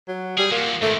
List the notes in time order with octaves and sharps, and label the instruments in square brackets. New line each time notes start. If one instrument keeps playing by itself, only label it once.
[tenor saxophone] F#3
[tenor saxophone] G3 [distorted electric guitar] G#4
[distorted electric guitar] F3 F#3 [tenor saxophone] A#3
[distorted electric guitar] G#2 D#3 [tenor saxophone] A3